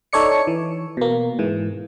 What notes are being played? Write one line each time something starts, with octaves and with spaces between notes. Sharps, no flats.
D#4 A4 C#5 D5 C#7
E3
B2 A#3
G#2 E3